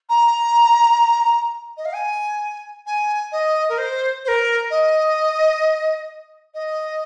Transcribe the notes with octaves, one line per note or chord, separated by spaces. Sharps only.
A#5
D#5
F5
G#5
G#5
D#5
A#4
C5
C5
A#4
D#5
D#5